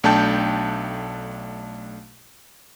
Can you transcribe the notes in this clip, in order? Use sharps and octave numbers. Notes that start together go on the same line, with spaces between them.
B1 A3 D4 G5 A5 G6